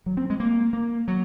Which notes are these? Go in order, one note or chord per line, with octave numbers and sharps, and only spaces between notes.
F#3
C4
G#3
A#3
A#3
F#3